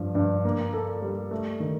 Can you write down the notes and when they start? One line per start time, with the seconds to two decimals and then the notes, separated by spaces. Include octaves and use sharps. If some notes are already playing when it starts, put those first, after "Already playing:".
Already playing: G2 F3
0.15 G2
0.45 A#3
0.74 A4
1.02 G3
1.31 A3
1.60 D#3